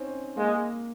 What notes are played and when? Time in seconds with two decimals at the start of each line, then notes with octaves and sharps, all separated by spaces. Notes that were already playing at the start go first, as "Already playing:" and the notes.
Already playing: C4 C#4 D#4
0.37 G#3 A#3